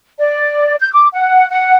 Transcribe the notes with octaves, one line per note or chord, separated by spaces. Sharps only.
D5
G6
D6
F#5
F#5